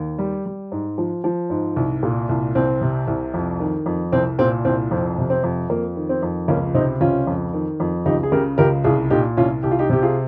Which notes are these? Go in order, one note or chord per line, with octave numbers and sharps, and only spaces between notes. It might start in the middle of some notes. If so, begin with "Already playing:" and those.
Already playing: D#2
G3
G3
G#2
F3
F3
G#2
C2
A#2
C2
C2 C4
C3
C2
F2
D#3
F2
C2 C4
A#2 C4
C2 C4
F2 C4
C3
C4
F2
F2 A#3
D#3
C4
F2
C#2 A#3 C#4
C3 C4 D#4
C#2 C#4 F4
F2
D#3
F2
C#2 D#4 G4
G#4
C#3 G4 A#4
C#2 G4 A#4
C2 F4 G#4
A#2 D#4 G4
C2 C#4 F4
C2 G4
F4
D#4 G4
C3 G4
F4 G#4